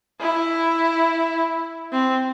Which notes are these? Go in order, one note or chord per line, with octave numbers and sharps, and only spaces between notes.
E4
C4